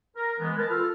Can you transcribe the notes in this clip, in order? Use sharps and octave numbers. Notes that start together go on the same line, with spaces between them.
A#4
E3 G#3 B3
A#4 B4 A5
F4 A4 F6